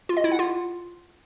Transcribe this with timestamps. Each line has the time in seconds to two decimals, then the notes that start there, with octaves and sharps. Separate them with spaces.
0.09 F4
0.17 D#5
0.24 E4
0.32 F#5
0.39 F4